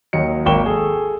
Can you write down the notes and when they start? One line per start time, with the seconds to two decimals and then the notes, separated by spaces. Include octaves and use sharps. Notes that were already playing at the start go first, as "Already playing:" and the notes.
0.13 D#2 F#3 D#5 C#7
0.46 G#1 A#3 G5 C#6 E7 G7
0.66 G#4 A4